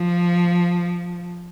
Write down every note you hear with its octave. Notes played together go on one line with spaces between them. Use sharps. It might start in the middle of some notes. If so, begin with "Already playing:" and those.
Already playing: F3